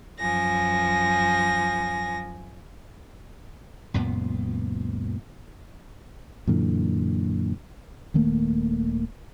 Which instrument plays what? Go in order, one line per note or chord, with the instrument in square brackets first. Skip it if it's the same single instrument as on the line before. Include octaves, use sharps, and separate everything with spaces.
[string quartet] F#2 F3 G#5 A#6
[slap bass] C#2 F#2 A#2 B3
[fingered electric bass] F#2 A#2 D3 E3
D#1 D#3 A3 A#3